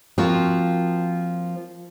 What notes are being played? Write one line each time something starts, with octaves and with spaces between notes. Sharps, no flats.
F3 A#3 C4 F4 F#4